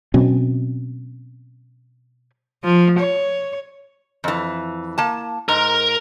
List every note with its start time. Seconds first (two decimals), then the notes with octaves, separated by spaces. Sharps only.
0.14 B2 F#3 C4 C#4
2.64 F3
3.00 C#5
4.24 F2 E3
4.98 A#3 A5
5.49 G#2 A#4 A#5